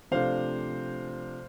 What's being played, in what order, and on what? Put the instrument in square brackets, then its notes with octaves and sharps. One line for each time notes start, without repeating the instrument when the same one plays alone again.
[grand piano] C3 F3 A3 D4 C5 F5